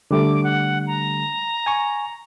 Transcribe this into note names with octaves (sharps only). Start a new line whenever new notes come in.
D3 G3 A3 D6
F#5
A#5
G#5 C#6